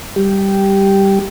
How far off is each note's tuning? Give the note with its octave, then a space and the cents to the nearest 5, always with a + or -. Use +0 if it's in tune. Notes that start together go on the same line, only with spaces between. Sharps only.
G3 +0 G4 -5